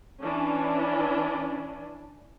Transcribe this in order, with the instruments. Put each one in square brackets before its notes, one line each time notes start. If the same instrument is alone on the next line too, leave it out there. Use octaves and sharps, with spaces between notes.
[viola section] E3 C#4 D4